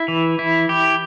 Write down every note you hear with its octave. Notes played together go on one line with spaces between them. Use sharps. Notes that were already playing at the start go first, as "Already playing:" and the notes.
Already playing: E4
E3
E4
G4